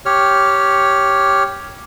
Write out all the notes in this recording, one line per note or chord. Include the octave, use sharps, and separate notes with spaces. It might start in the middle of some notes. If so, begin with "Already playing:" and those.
G4 C#5 F6